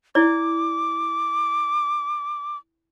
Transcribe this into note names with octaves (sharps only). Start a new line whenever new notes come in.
E4 D5 D6